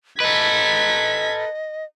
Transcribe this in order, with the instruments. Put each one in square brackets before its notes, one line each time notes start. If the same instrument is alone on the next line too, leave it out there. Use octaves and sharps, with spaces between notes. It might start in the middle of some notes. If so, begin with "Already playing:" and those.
[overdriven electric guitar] A4 B4 [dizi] D#5 [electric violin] G#6 B6